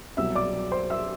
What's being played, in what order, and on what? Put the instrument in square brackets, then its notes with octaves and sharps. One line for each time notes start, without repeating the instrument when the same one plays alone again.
[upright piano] C2 B2 F#3 E5 E6
D5 D6
C5 C6
E5 E6